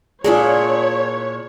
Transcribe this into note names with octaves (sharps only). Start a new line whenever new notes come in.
A#2 D4 E4 F4 G#4 C#5